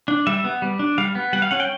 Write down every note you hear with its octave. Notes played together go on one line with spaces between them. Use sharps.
D4
G3 E5
B3
G3
D4
G3 F5
B3
G3 F#5
F5
C#4 F#5
G5